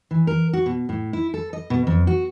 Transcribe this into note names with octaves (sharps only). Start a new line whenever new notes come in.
E3
A#4
F#4
B2
A2
E4
A4
D#5
B2
F2
F#4